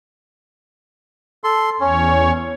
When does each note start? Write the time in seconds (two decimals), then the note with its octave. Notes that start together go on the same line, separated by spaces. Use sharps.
1.44 A4 C6
1.81 E2 C#4 C#5